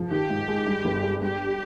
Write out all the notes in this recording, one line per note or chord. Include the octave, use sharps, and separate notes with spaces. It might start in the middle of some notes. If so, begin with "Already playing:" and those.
Already playing: F3
D#3 G4
G#2
G#3
G2
G1
G3
G2 G4